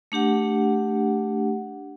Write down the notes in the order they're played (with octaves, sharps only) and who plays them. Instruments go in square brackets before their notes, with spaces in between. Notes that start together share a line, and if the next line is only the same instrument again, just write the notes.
[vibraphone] A3 D4 G4 F#5